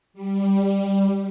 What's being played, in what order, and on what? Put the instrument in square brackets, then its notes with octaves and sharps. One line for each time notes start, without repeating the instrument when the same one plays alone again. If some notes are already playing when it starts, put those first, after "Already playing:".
[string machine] G3